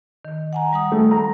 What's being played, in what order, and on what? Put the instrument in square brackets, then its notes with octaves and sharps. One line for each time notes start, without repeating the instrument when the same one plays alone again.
[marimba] D#3
F#5 G#5 A#5
G3 F#5 D#6
[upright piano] A3
A#5